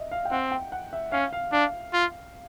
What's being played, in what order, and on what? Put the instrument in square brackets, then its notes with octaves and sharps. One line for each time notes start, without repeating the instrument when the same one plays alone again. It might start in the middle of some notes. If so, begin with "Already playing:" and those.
Already playing: [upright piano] D#5 E5
F5
G5
[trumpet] C4 [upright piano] F#5
[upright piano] G5
F#5
E5
[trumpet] C#4 [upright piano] F5
[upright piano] F5
[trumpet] D4 [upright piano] F5
[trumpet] F4